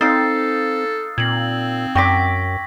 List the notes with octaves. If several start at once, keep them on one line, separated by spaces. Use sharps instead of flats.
C4 D#4 A4 F5 E6 A6 C7
A#2 C4 G#6 F#7
F#2 G5 C#6 D6 A#6 B6